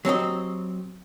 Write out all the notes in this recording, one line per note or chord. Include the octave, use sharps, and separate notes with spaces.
F#3 C4 G4 D#5